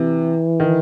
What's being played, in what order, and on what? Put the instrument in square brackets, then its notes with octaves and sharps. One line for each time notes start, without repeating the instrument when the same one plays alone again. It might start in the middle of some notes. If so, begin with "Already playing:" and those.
Already playing: [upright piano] C3 [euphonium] E3
[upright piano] D#3